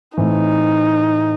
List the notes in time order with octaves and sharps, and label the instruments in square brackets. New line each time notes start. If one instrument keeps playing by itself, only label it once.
[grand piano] A2 E3 C4 [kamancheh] D#4